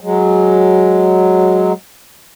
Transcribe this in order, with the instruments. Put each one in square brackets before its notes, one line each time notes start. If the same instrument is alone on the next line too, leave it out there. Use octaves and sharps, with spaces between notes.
[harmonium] F#3 G#3